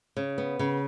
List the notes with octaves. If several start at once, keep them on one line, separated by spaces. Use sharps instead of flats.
C#3
B3
C#3